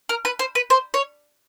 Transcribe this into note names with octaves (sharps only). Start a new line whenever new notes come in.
A#4
B4
C5
B4
C5
C#5